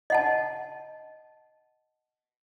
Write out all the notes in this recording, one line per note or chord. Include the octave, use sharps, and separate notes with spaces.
D#5 F#5 A5